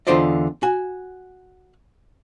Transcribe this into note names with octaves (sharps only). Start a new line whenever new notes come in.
E2 D3 F4 C5 D5 D#5
F#4 G#5